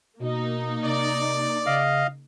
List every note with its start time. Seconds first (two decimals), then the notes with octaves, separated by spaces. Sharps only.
0.19 B2 A#3 D#4
0.84 C3 D5
1.66 C#3 D#5 F5